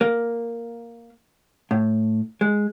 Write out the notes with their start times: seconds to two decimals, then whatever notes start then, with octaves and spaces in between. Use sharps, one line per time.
0.01 A#3
1.71 A2
2.41 G#3